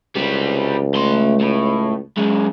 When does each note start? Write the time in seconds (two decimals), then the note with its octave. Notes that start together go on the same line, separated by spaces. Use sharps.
0.16 C#2 G3 C4
0.95 A3 C6
1.41 A2
2.18 F#2 G#3